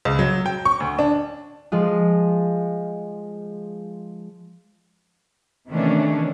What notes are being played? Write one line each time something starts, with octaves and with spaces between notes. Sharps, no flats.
C#2
F#3
G5
C#6
D2
D4
F3 G#3 F4
C3 D#3 E3 A3 C#4 D4